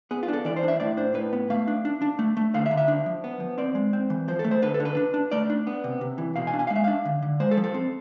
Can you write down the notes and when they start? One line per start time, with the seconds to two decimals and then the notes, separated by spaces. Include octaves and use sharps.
0.11 B3 G#4
0.23 F4
0.28 D4 A4
0.45 E3 D5
0.56 C5
0.63 D4
0.68 E5
0.80 A2 D5
0.97 D4 C5
1.14 A2 B4
1.33 B3
1.50 A3 F5
1.68 D4
1.85 D4
2.02 D4
2.19 A3
2.37 A3
2.54 D3 F5
2.66 E5
2.71 D3
2.77 E5
2.88 D4
3.06 F3
3.24 B3
3.40 F3
3.58 C4 D5
3.75 G#3
3.93 C4
4.10 E3
4.28 F3 C5
4.39 A4
4.44 A3
4.51 C5
4.62 D3 B4
4.74 A4
4.80 D3
4.85 B4
4.97 D4
5.14 D4
5.32 A3 D5
5.50 D4
5.67 B3
5.84 C3
6.01 C3
6.18 E3
6.36 B2 F5
6.47 G#5
6.53 D4
6.59 G#5
6.67 F5
6.70 G#3
6.76 E5
6.84 D4 F5
7.05 D3
7.22 D3
7.40 G#3 C5
7.51 A4
7.57 F3
7.64 A4
7.74 C4